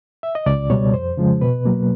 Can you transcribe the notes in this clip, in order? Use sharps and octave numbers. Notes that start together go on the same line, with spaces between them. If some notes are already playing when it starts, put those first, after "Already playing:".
E5
D#5
C#2 D5
B2 G3 C#5
F2 C5
C#3 F3 G#3
B2 B4
F#3 A#3